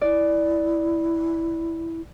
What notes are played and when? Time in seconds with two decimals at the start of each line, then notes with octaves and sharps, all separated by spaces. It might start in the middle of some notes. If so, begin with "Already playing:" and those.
0.01 E4 D5